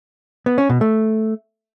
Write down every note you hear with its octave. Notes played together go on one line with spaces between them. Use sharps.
B3
C#4
B2
A3